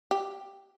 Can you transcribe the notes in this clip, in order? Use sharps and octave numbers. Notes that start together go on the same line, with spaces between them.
G4